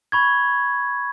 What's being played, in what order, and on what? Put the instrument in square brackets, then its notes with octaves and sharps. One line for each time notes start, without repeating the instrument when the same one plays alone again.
[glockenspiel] B5 C#6 G#6